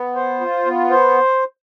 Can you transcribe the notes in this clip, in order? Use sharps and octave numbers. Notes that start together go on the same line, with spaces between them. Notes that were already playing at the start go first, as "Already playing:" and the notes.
Already playing: B3
C5
F4
B3
C5